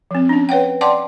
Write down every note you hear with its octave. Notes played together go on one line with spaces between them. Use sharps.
F3 C4
C#4 D4
B4 C#5 F#5 G5
D5 F#5 G5 A5 C6 D6